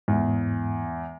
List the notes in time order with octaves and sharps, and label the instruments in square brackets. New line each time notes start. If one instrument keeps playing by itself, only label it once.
[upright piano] E2 [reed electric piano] G#2